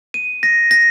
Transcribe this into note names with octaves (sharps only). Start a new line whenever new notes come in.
D#7
A#6
A#6